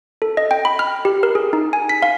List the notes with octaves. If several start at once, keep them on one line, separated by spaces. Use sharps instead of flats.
A4
D#5
G5
B5
F6
G4
A#4
G#4
D#4
G#5
B6
F5